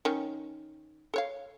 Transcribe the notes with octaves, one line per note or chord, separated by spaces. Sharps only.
D#3 C#4
A4 C#5 F5